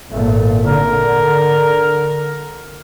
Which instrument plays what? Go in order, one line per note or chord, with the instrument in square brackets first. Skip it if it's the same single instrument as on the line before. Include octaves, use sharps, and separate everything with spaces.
[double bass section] G#1 A#2 A3
[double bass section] D3 [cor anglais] A#4